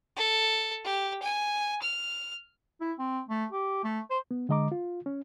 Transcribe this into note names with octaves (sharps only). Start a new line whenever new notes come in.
A4
G4
G#5
F6
E4
C4
A3
G4
A3
C5
B3
D3 G#3 D#5 A#5 D6
F4
C#4